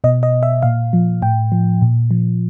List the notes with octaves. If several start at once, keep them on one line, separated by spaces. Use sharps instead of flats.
B2 D#5
D#5
E5
A#2 F5
F3
A2 G5
F3
A#2
F3